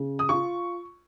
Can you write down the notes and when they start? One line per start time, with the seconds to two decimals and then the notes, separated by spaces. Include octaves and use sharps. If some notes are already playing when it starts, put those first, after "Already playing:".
Already playing: C#3
0.19 D#6
0.29 F4 C#6